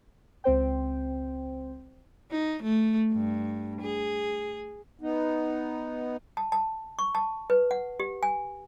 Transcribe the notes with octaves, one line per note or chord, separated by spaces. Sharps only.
C#2 C4 C5 G5
D#4
A3
G2
G#4
B3 D#4
A5
A5
C#6
A5
B4
F#5
G4
G#5